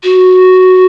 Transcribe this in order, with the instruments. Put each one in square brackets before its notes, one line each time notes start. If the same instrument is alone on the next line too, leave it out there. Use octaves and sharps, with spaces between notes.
[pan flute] F#4